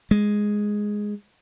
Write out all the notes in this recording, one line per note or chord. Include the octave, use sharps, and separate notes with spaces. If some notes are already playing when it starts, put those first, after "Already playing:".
G#3